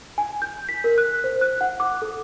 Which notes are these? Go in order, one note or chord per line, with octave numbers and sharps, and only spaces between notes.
G#5
G6
B6
A#4
F#6
C5
F#6
F#5
D6
A4